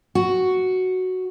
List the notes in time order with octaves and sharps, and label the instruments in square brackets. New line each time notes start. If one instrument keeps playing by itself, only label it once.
[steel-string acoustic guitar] F#4